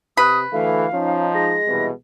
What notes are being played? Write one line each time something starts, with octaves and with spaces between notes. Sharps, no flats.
C3 B4 D#6
D2 E3 A3 F5
F3 C#4 D#4
G#3 A#6
C2 B2 E3